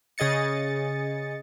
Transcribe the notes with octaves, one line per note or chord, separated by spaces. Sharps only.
C#3 G#4 D#5 A6 C#7